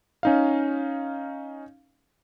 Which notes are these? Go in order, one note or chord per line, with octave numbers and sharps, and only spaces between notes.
C#4 D#4 F5